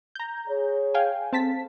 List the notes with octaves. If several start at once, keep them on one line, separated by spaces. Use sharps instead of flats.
A#5 G6
G#4 C#5
F5 G5 G#5
C4 G#4 A4 F5 A5 B6